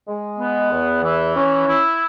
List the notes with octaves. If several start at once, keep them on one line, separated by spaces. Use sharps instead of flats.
G#3
B3
E2
E3
C#4
E4